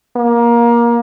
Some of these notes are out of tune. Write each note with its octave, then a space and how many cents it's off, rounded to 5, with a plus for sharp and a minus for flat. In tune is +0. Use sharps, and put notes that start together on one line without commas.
A#3 +20